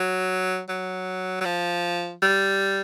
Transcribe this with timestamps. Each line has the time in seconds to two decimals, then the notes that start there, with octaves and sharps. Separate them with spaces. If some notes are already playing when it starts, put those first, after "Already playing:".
Already playing: F#3
0.69 F#3
1.41 F#3
1.45 F3
2.22 G3